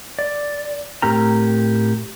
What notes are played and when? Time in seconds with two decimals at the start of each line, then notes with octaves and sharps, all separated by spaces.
0.19 D5
1.02 A2 C4 G4 A#4 A#5